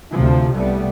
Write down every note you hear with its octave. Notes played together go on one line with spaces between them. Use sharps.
D2 C3 F3
C2 G3 A3 B3